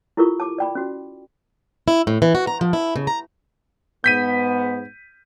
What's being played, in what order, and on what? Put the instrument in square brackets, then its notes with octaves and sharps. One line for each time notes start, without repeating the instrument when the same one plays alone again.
[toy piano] E4 F4 G4 A4 A#4 C#6
A5 D6
D5 G5 B5
C#4 F#4
[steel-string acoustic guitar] E4
A2
E3
F#4
A#5
F3
E4
C#3
A#5
[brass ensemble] G#2 B3 [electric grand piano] G6 B6 D#7